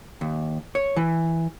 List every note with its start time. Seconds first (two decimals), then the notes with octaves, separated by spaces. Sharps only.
0.21 D#2
0.75 C#5
0.96 E3